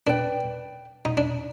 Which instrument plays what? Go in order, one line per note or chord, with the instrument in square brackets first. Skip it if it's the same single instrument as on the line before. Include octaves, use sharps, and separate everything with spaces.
[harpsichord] D4 [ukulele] B4 D5 G5
[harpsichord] D#4
D4